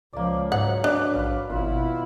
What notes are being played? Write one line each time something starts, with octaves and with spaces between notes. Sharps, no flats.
C#2 F3 A#3 D5
G#2 F#3 F#5
D4 B4 D6
A#1 F5 B5
G#1 B2 E4 F4